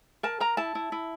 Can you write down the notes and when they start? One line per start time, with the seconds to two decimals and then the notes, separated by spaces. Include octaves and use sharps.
0.23 A#4 A5
0.40 A#4 A#5
0.57 E4 A5
0.75 E4
0.92 E4